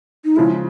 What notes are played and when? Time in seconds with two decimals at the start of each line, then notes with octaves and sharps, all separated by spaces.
0.25 D#4
0.36 C#3 F3 G#3 E4